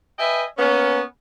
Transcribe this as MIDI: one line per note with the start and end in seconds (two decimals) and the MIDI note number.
0.18 0.43 71
0.18 0.43 75
0.18 0.43 76
0.18 0.43 79
0.18 0.43 80
0.58 1.00 58
0.58 1.00 59
0.58 1.00 61